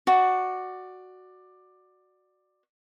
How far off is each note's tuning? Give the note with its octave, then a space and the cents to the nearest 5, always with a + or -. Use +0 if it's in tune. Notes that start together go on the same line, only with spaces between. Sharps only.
F#4 +0 D5 +15